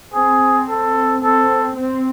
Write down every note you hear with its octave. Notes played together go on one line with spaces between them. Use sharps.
C4 G#4
A4
C4 A4
C4